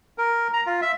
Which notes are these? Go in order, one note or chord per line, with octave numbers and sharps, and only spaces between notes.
A#4
A#5
F4
E5